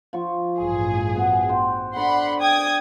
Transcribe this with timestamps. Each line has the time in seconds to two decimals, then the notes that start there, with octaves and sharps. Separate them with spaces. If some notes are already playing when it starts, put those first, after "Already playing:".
0.13 F3 C#6
0.59 A1 G2 G#4
1.15 B3 F#4
1.49 C5 F#5 G5
1.96 D3 D5 F#5 B5 C6
2.41 G5 D#6 G#6